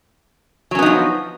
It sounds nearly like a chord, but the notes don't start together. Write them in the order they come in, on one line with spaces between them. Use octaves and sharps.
F#3 C#4 B3 D#4 F3